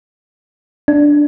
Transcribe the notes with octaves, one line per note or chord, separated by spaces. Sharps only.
D4